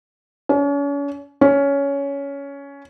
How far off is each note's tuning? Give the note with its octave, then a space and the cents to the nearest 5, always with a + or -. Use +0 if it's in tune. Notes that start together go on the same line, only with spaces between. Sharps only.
C#4 +40
C#4 +15